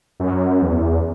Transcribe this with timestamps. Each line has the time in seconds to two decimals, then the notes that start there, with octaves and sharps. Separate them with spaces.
0.20 F#2
0.62 E2